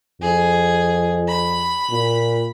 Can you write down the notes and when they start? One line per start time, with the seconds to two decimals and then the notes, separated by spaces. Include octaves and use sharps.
0.22 F2 G#4
1.28 B5
1.90 A#2